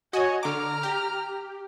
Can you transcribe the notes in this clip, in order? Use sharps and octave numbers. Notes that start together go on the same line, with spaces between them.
F#4 C#5 D#5 G#5
D3 A#5 D6 F6
G4